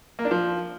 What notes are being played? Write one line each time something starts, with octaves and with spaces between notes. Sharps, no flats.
A#3
D4
F3